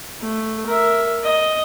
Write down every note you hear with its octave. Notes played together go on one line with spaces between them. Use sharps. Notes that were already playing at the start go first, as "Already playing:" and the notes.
A3
A#4 E5
D#5